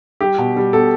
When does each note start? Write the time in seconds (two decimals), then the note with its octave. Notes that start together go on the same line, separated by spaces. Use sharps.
0.21 G3 G4
0.38 B2
0.56 G3
0.73 B2 A4